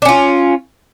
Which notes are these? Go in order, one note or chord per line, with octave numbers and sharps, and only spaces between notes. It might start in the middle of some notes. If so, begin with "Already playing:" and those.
C#4 D4 F4